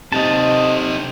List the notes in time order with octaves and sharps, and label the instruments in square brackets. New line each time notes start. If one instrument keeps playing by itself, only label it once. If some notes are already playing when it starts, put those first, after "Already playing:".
[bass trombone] C3 [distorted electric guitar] D#4 A4 [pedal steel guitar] D#5 A5